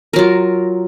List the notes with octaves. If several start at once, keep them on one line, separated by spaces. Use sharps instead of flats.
F#3 F4 A#4